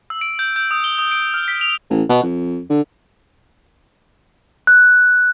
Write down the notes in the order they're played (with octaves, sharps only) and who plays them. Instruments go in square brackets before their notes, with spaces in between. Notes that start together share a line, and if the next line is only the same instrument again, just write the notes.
[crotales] E6
D7
G6
G6
D#6
G7
D#6
D7
F6
B6
F7
[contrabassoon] A1
B2
F2
D3
[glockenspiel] F#6